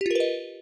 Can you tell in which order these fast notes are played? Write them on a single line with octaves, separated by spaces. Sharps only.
G4 F4 A#4 B4 D#5